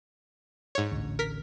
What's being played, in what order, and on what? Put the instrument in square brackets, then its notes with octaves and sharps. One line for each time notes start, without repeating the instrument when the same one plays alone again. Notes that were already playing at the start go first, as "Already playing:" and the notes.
[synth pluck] G#2 C#5
[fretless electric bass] A1 D2
[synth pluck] A#4 B6